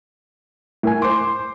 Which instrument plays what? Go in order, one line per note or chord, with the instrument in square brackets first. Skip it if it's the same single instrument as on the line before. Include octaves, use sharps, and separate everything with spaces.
[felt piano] A2 [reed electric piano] E4 A#4 G#5
[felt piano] C5 D6 [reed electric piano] C6